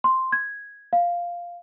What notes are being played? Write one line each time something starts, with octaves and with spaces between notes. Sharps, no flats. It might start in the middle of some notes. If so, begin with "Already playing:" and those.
C6
G#6
F5